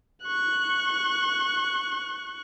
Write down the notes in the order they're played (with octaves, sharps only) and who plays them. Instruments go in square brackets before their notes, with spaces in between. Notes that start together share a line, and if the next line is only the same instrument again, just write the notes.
[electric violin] C#6 F#6